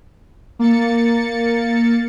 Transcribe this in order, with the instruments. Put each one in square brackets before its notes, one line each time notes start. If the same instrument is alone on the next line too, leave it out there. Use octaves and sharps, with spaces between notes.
[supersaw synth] A#3 A6 C#7